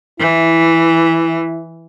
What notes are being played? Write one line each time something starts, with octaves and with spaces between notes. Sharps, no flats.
E3 E4